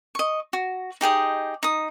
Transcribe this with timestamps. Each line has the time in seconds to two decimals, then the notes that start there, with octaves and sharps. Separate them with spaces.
0.15 D#5 C#6
0.53 F#4
1.01 D#4 G4 G#4 D#5
1.63 D#4 D#6